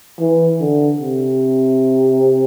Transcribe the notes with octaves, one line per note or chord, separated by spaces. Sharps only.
E3
D3
C3